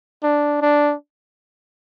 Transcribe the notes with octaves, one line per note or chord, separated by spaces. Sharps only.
D4
D4